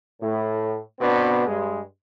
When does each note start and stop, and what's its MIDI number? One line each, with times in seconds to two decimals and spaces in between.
0.21 0.78 45
1.00 1.42 47
1.00 1.42 59
1.00 1.42 60
1.00 1.42 62
1.47 1.80 43
1.47 1.80 56